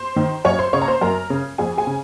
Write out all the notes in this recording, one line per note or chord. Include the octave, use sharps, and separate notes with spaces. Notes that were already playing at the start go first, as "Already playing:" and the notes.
Already playing: C5 C6
D#3
F#2 C#5 C#6
C5 C6
C#3 C#5 C#6
A#5
C5 C6
F#2 A#4 A#5
C#3
F2 G#4 G#5
G#4 G#5
C#3